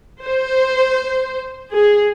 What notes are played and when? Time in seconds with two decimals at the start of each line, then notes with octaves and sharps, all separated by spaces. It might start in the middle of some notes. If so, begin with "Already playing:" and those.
0.23 C5
1.71 G#4